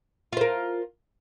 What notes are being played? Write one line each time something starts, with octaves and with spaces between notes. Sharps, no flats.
F4 A#4 C5